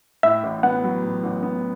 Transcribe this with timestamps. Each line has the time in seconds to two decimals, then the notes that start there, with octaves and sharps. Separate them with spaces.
0.23 A2 E5
0.44 A1
0.63 B3 F#5
0.84 F#3
1.03 A2
1.24 A1
1.43 B3